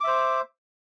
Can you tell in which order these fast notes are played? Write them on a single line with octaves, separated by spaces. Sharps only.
D6 E5 C5